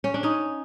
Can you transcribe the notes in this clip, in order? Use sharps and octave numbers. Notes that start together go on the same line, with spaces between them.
C#4
D4
C#4 D#4